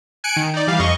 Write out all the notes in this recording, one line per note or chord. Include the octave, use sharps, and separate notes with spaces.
G#5 F#6 C#7 D7
D#3
D#4 D5
E3 G3 F5
F2 D#5 C#6